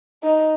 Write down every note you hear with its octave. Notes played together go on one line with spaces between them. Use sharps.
D#4